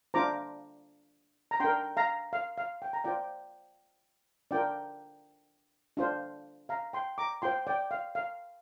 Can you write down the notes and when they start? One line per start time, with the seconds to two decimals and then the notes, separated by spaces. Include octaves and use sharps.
0.14 D4 F4 C5 A#5 D6
1.51 A#5
1.60 D4 A#4 G5 C6
1.97 F5 A#5
2.33 F5
2.57 F5
2.82 G5
2.93 A#5
3.04 F4 C5 D5 G5
4.51 D4 F4 A#4 D5 G5
5.97 D4 F4 C5
6.69 F5 A#5
6.93 G5 C6
7.18 A#5 D6
7.42 F4 C5 G5 C6
7.67 D5 G5
7.91 F5
8.15 F5